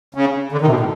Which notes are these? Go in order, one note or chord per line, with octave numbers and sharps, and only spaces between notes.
C#3
D3
D#3
C3
B2
A2